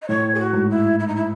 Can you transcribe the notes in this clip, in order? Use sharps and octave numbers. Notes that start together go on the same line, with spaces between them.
D#5
A2 C#5
G#4
F#4
G#2
E4
E4
D#4
E4